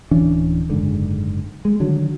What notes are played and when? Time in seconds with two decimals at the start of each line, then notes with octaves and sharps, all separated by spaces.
0.11 D1 E3 C#4 D4
0.70 F#1 G#2 D3
1.65 G#3
1.80 D3 D#3 F#3